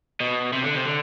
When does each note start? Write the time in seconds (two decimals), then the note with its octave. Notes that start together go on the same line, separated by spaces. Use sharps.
0.20 B2
0.53 C3
0.64 D3
0.75 C3
0.86 D3